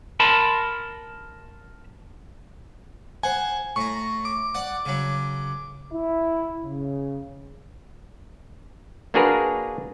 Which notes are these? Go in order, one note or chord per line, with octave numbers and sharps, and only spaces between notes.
A#4 A5 B5 C6
C5 F#5 G#5
A2 A#5 C#6
D6
D5 F#5
C#3 F#3
E4
C#3
A#3 D4 F#4 G#4 A#4 B4